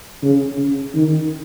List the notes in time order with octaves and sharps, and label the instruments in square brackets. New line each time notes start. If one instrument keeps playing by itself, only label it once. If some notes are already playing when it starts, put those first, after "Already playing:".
[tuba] C#3
C#3
D#3